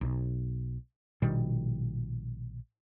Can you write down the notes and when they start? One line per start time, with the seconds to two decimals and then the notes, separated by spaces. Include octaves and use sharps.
0.01 B1
1.22 A#1 B2 D#3 G3